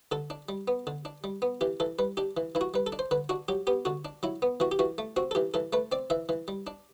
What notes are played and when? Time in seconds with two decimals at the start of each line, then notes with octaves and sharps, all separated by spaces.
0.12 D3 A4
0.30 D4
0.49 G3
0.68 B3
0.87 D3
1.05 D4
1.24 G3
1.42 B3
1.61 E3 G4
1.80 E3 A4
1.99 G3 B4
2.17 D4 G4
2.37 E3
2.55 E3 E4
2.61 F#4
2.74 G3 B4
2.87 A4
2.92 D4
2.99 C5
3.11 D3 B4
3.29 D4 F#4
3.48 F#3 G4
3.67 B3 G4
3.85 D3 F#4
4.05 D4
4.23 F#3 E4
4.42 B3
4.60 E3 F#4
4.72 G4
4.79 E3 F#4
4.98 A3
5.16 C4 F#4
5.31 A4
5.35 E3 G4
5.54 E3 A4
5.73 A3 B4
5.92 C4 D5
6.10 E3 E5
6.29 E3
6.48 G3
6.67 D4